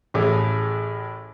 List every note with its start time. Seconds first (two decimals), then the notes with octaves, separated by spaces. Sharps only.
0.14 A1 A2 G#4